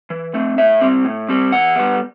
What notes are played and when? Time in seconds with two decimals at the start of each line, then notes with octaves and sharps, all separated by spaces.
0.10 E3
0.34 A3 C4
0.58 A2 E5
0.81 G3 C4
1.04 A2
1.29 G3 C4
1.52 E3 F#5
1.76 G3 B3